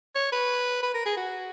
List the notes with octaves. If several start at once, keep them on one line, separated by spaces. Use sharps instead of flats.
C#5
B4
B4
A#4
G#4
F#4